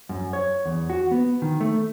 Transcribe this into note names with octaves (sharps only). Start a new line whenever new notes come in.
F#2
C#5
E2
F#4
B3
D#3
A3